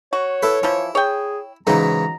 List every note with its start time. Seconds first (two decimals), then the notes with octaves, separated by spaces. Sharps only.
0.13 F#4 C#5
0.43 E4 A4 B4
0.63 E3 F3 E4
0.95 G#4 C#5 G5
1.67 G#2 C#3 E3 F#3 D#4 A#5